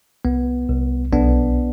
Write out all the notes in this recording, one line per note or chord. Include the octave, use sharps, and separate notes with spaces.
C2 B3
C2
B1 B3 D4